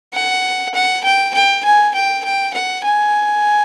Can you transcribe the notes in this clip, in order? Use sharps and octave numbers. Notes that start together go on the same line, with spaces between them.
F#5
F#5
G5
G5
G#5
G5
G5
F#5
G#5